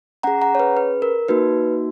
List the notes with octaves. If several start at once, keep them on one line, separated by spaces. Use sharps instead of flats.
C#4 G#4 F#5 A#5
F#5 A#5
C#5
B4
B4
A#4
A#3 D#4 F#4 B4